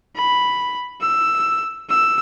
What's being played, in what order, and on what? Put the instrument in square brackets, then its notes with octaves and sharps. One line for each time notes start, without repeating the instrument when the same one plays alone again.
[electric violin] B5
E6
E6